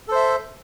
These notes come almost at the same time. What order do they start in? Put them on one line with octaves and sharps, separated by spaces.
A4 C5 E5